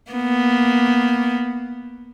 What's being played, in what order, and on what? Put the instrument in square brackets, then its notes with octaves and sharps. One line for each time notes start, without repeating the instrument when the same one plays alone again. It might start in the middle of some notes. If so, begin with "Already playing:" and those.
[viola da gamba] A#3 B3